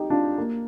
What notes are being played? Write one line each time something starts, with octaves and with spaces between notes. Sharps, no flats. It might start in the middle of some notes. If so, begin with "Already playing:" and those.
Already playing: D#4 G4
D4 F4
A#3